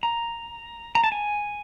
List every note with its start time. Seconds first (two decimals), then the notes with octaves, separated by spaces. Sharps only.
0.03 A#5
0.95 A#5
1.04 A5
1.12 G#5